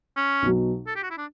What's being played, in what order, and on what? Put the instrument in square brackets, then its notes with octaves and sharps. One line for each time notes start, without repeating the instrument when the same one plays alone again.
[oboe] C#4
[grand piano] B1 B2 F#3
[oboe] A4
G4
F#4
E4
D4